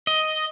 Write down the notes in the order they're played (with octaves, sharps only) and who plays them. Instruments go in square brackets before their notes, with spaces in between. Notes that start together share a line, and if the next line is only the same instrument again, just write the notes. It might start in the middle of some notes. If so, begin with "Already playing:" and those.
[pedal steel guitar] D#5